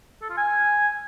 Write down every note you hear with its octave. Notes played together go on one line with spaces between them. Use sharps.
A4
F4
G#5